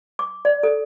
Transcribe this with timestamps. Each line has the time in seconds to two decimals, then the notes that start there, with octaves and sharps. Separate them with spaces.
0.19 D6
0.45 D5
0.63 A4